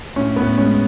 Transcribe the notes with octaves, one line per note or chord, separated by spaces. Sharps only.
A2 C#4
A2 B3
G#3 C#4